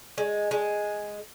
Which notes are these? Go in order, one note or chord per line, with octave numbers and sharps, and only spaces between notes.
G#3
G#3